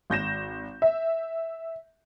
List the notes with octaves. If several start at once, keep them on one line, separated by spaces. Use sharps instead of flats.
G#1 G6 A#6 E7
E5